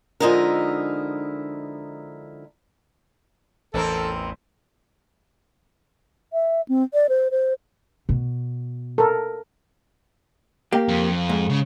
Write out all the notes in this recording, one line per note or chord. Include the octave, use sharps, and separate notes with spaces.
D3 F3 G#3 D#4 E4 A#4
A1 E2 E3 C4 A4 A#4
E5
C4
D5
C5
C5
B2
A4 A#4
A#3 G4
F2
G#2
C#3